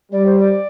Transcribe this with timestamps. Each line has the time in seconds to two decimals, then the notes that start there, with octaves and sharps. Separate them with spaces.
0.12 G3 D5
0.26 C5
0.39 D5